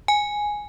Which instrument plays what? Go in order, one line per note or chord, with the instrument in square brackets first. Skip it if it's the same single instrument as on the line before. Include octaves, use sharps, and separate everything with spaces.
[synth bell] G#5